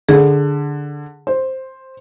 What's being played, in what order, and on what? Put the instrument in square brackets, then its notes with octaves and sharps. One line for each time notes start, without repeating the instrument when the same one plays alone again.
[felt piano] D3 [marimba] G#4
[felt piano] C5